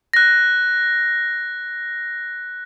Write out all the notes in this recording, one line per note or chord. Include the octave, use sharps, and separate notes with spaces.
F#6 A#6